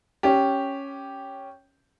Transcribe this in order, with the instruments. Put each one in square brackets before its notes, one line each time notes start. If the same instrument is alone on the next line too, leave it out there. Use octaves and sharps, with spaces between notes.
[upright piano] C#4 G4